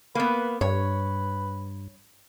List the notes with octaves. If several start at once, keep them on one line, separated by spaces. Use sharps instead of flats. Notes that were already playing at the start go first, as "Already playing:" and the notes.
A#3 B3 B4
G2 B4 C#5